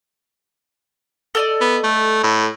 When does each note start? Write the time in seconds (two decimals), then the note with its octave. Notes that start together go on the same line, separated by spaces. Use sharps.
1.35 A4 D5 D#5
1.61 B3
1.84 A3
2.23 A2